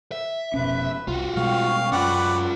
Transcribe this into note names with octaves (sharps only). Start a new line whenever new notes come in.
E5
F1 B2 C#4 B4
C2 F4 F#4
B2 G3 G#3 F5 G5 C#6
F#2 C#4 F4 B4 D5 F#5